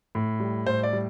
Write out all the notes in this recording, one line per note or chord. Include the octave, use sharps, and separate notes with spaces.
A2
G3
A2 C5
D5
G3